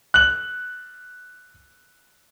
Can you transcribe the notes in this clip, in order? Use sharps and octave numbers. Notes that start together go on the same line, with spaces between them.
F#6 F#7